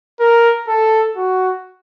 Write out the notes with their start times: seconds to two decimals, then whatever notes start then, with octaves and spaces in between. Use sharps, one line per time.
0.20 A#4
0.67 A4
1.16 F#4